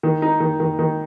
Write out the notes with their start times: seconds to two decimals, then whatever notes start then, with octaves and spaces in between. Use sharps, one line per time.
0.03 D#3
0.22 D#4
0.40 D#3
0.60 D#3
0.79 D#3